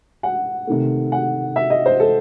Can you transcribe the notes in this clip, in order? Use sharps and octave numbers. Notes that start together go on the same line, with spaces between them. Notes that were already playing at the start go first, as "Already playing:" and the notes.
F#5
C3 D#3 A3
F#5
E5
D#5
C5
A4